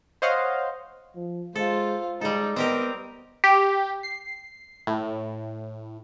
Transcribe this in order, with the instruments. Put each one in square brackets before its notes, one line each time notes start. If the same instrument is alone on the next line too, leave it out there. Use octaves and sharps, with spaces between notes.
[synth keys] C5 C#5 D#5 F5 F#5
[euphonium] F3
[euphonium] G#3 [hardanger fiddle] F4 C5 [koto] A4
[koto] G3 A4 [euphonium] G#3 [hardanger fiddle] D#4
[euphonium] B3 [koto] C4 G4 A#4 [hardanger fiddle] D#5
[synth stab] G4
C7
A2